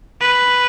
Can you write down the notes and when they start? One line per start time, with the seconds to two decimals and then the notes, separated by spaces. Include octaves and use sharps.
0.21 B4